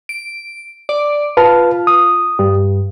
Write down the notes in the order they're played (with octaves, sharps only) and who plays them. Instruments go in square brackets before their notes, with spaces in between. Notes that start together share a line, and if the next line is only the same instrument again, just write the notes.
[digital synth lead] D7
D5
[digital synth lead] F4 [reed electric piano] B4 A5
[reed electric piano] D#6
[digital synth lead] G2